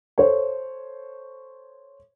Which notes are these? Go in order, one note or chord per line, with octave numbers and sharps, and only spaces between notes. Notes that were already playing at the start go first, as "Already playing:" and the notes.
A4 C5 C#5